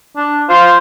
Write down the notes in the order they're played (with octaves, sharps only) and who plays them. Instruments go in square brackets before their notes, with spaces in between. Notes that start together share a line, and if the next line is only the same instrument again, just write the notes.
[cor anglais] D4
[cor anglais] F4 [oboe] C5